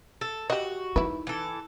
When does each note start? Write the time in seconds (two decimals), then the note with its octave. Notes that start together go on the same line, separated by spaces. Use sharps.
0.21 A4
0.50 F#4 G4 D#5
0.96 D#4 E4 B4
1.27 E3 A4